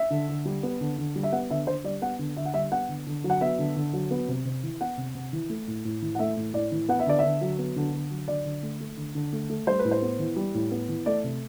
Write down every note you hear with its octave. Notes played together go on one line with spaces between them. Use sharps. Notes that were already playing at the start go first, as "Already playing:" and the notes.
Already playing: E5
D3
D3
G3
B3
D3
D3
G3
E5
B3 F#5
D3 E5
D3 C5
G3 D5
B3 F#5
D3
D3 E5
F#5
G3 E5
B3 F#5
D3
D3
F#3
F#5
B3 E5
D3
D3
F#3
B3
C3
C3
E3
B3 F#5
C3
C3
E3
A3
A2
A2
E3
F#5
A3 E5
A2
A2 D5
E3
B3 F#5
E5
D3 D5
D3 E5
F#3
B3
D3
D3
F#3
D3 D5
D3
A3
A3
D3
D3
A3
A3
G3 C5
B4
A2
C5
B3
E3
G3
A2
B3
E3
A3 D5
C3